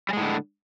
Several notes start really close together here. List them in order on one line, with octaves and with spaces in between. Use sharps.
G3 G#3 A2 D3